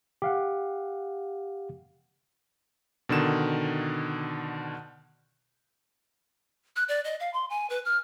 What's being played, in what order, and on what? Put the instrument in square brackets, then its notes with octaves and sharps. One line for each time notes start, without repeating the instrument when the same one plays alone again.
[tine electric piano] G4 F5 F#5
[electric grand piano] B2 D3 D#3 E7
[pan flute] F#6
D5
D#5
F5
C6
G#5
B4
F6